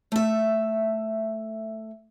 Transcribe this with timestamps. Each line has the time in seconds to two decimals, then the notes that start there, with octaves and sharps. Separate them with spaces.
0.12 A3 E5